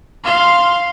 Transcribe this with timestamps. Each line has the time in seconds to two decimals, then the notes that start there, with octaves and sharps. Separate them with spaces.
0.24 F5 C6